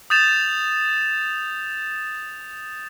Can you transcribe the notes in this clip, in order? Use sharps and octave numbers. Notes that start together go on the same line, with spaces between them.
D#6 G6 A6 E7 F7